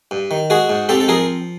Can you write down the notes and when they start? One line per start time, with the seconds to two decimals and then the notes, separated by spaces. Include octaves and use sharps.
0.11 G2
0.31 D#3
0.50 G#3 F#4 G#4
0.69 G#2
0.89 C4 G4 A4
1.00 A4
1.08 F3 G#4 A#4